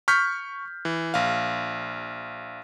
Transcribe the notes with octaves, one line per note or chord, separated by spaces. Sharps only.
C#6 F6 G6 B6
E3
A#1 F5